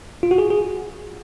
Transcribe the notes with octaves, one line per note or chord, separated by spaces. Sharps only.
F4
F#4
G#4
G#4